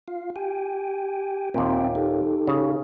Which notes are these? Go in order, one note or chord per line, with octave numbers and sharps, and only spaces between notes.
F4 F5
G4 G5 G#5
D#2 A#2 C4 E5 G5
D#4 G4 A4
C#3